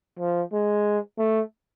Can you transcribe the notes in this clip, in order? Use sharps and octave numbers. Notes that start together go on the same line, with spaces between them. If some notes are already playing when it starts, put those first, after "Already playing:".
F3
G#3
A3